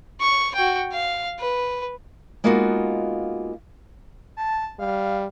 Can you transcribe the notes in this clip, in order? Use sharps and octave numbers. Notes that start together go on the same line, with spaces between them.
C#6
F#4 G5
F5
B4
G#3 A#3 B3 D#4 F4 F#4
A5
G3 F5